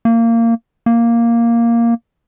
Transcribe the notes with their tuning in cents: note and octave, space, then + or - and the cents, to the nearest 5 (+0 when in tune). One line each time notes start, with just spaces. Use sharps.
A#3 -20
A#3 +0